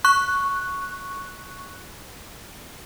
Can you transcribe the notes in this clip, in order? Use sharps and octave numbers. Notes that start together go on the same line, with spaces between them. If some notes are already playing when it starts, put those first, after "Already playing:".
C#6 F#6